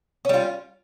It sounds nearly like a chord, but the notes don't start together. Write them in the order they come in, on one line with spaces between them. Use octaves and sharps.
C#4 G3 F4